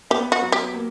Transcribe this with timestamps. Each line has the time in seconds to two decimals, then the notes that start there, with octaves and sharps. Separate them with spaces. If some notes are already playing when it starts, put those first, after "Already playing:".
0.10 B3 G4
0.32 F#4
0.42 F#3
0.52 G4
0.73 A#3